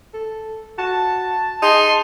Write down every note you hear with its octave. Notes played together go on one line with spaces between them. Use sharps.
A4
F#4 A5
D#4 G#4 C6